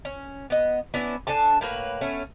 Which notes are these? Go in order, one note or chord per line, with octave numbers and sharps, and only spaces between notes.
C#4
B3 D#5
B3 C#4 D4 E4
D4 A4 G#5 A5
A2 A#3 B4 C#5
A3 B3 C#4